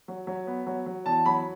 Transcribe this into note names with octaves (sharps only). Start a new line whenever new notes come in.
F#3
F#3
B3
F#3
F#3
E2 A5
F#3 B5